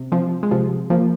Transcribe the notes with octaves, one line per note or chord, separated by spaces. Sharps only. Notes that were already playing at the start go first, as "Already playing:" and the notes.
Already playing: C3
C3 F3
G#3
C3 F3
F3 A#3